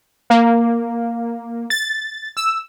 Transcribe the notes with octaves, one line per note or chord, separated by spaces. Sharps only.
A#3
A6
E6